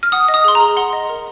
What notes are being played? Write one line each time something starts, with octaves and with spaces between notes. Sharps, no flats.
F6
F#5 D#6
D#5
D#6
G#4 C6
A#5
G#4
F#5 C6
D#5
A#4